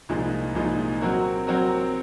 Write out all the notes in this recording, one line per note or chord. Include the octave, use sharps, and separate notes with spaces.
C2 A#2 F3 G#3 D#4
C2 A#2 F3 G#3 D#4
F#3 C4 F#4 A#4
F#3 C4 F#4 A#4